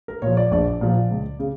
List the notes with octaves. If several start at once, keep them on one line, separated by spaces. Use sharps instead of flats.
A#4
A#2 F3 C#5
D5
A#1 D5
A#2 F3
C#2
C#3